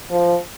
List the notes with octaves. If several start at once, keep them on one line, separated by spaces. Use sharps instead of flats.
F3